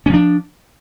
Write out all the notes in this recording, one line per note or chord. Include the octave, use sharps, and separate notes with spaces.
F3 C#4 D4